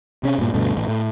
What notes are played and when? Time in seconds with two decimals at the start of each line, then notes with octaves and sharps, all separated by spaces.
0.23 C3 C#4
0.38 G2 A#2
0.54 D2 G2 B2 A3
0.75 A1 A2
0.88 A2